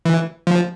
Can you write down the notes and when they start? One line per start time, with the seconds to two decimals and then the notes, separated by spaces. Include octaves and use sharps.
0.05 E3
0.47 F3